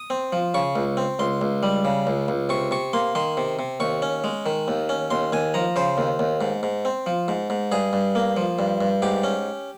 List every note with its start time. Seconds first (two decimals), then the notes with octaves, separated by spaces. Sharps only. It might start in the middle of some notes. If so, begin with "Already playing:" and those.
Already playing: D#6
0.10 C4
0.33 F3
0.54 C#3 C#6
0.76 C#2
0.97 C4
1.19 C#2 C6
1.41 C#2
1.63 G3
1.85 C#3
2.07 C#2
2.28 C#2
2.49 C3 C#6
2.71 C3 C#6
2.93 A#3 C6
3.15 D#3 C6
3.37 C3
3.59 C3
3.80 D#2 C#6
4.02 C#4
4.24 G#3
4.46 D#3
4.68 D#2
4.89 C#4
5.10 D#2 C6
5.33 D#2 G#5
5.54 F3 A#5
5.76 C#3 C5
5.98 D#2
6.19 D#2
6.41 G#2
6.63 G#2
6.85 C4
7.06 F3
7.28 G#2
7.50 G#2
7.72 G2 G#4
7.93 G2
8.15 A#3
8.37 F3
8.59 G2
8.81 G2
9.02 G#2 G4
9.24 C#4